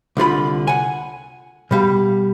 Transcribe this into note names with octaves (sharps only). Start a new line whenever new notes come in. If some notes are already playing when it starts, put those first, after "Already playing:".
C2 D3 F4 B5
F#5 G#5
B2 G3 F5